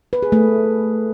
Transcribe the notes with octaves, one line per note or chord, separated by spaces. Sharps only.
B4
G#4
A3